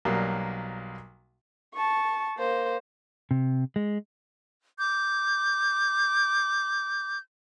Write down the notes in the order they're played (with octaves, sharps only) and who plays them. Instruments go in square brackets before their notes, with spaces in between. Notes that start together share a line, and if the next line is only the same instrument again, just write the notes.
[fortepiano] B1 F#3 G3 A#3
[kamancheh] A5 C#6
A#3 C5
[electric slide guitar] C3
G#3
[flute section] D6 G6